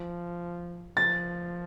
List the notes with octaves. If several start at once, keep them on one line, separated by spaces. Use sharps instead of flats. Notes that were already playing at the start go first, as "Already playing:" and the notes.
Already playing: F3
F3 A6